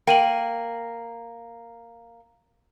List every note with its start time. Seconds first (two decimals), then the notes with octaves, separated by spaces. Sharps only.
0.07 A#3 G5 D#7 F#7